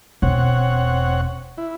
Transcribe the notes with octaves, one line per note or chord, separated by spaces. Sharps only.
E1 C4 C#5 F#5
E4